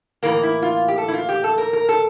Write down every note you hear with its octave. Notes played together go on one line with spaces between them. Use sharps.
A2 E3 A#3 A#4
E4
F4
G4
A4
E4
F4
G4
A4
A#4
A#4
A4